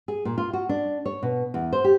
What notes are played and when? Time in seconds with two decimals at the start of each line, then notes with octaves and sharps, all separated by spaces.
0.08 G#4
0.25 A#2
0.38 F4
0.53 F#4
0.69 D4
1.06 C#5
1.23 B2
1.54 E2
1.73 C5
1.84 G4